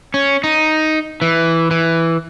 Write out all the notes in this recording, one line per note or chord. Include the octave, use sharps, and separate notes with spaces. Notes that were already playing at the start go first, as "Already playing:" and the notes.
C#4
D#4
E3
E3